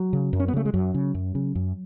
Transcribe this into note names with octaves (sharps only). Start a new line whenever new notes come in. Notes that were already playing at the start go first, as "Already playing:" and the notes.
Already playing: F#3
C#3
F#2
C#4
B3
C#3 A3
G#3
F#2 F#3
C#3
F#2
C#3
F#2